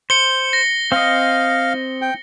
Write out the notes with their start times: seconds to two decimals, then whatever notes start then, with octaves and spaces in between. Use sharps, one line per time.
0.10 C5 C#7 G7
0.53 A#6
0.92 C4 D#5 F5
2.02 G5